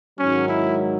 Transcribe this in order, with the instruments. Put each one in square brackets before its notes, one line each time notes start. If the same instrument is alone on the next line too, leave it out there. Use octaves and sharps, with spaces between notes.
[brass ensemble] G#2 D#3 F#3 [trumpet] C#4
[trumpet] E4